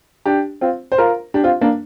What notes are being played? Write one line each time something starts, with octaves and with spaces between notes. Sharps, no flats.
D4 G4
C4 F4
C5
F4 A#4
D4 G4
C4 F4
A#3 D4